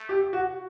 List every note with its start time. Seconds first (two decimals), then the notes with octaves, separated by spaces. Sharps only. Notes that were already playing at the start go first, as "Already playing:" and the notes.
Already playing: A3
0.09 G4
0.33 F#4